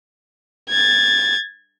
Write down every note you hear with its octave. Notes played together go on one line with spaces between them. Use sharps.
G#6 A6